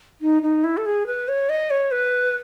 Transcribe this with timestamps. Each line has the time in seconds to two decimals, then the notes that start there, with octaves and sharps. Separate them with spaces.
0.21 D#4
0.43 D#4
0.64 E4
0.77 A4
0.86 G#4
1.07 B4
1.28 C#5
1.49 D#5
1.70 C#5
1.91 B4